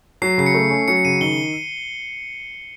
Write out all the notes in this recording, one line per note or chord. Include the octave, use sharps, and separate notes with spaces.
F#3 C7
C#3 C7
C#7
A3
C#4
F#3 C#7
C#3 D#7
D#3 G7